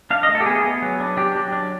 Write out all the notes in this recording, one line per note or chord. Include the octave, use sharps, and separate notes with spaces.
D4 F5
D#5
A3
A4
G4
B3 G#4
B3
F#3
D4
D4 G4
F#3
D4